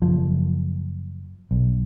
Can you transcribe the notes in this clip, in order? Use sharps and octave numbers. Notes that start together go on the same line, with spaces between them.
F#1 F3
B1